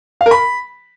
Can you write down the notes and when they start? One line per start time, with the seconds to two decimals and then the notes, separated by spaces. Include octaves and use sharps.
0.21 F5
0.26 A#4
0.31 B5